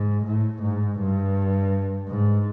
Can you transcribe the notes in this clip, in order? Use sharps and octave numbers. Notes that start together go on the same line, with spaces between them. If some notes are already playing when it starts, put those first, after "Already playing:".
Already playing: G#2
A2
G#2
G2
G#2